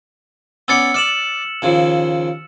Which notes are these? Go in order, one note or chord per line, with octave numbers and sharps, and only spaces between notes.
B3 C#4 D5 E6 A6 C#7
D5 F6 E7 F#7
D#2 C#3 F3